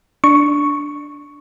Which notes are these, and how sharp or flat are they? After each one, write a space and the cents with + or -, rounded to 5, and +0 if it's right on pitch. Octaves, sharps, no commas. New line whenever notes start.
D4 -5 C#6 +0